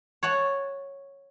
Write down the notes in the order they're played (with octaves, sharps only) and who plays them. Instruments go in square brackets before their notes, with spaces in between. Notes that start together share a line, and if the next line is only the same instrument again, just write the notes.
[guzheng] C#5 F#5 A5